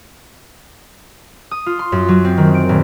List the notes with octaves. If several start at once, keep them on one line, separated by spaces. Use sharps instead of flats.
D#6
F4
C6
F#2
F#3
C4
D#3
D7
D#1